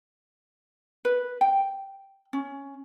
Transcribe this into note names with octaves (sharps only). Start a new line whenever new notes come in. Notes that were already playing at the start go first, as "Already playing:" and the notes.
B4
G5
C#4